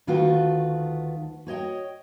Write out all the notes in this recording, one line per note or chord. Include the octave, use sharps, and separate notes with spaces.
D2 D#3 A3 F4 F#4 B4
F#4 C#5 D#5 G5